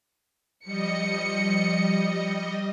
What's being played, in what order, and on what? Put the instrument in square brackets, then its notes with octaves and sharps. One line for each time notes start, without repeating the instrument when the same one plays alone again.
[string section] F3 C#7 [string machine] G3 D#5